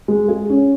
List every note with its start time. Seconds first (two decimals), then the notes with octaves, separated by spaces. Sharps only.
0.08 G#3
0.28 G#4
0.50 C#4